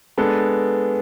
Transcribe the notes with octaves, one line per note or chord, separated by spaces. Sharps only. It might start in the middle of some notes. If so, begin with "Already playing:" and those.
G#3 B3 D4 A4